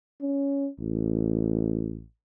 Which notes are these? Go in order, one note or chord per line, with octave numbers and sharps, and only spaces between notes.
C#4
A1